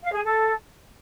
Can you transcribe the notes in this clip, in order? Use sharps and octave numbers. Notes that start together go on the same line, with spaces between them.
F5
G#4
A4